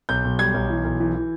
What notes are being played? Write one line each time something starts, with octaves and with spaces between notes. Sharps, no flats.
B1 G6
B1
G3 G#6
B1
E3
B1
E3
E3